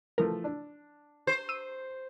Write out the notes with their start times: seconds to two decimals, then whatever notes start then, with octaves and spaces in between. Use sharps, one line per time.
0.18 E3 F3 A3 A#4
0.44 D4
1.27 C5
1.49 E6 D#7